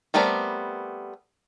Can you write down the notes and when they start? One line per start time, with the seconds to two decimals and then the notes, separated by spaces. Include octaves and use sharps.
0.14 G3 A3 B3 C4 A#4